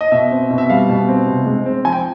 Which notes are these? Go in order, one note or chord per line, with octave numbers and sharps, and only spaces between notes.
D#5
B2 E5
C4
B2
E5
G3 F5
B2
C4
C3
G#3
C4
F3 G#5
G5